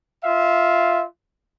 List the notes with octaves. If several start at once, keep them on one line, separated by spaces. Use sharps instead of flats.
F4 E5 F5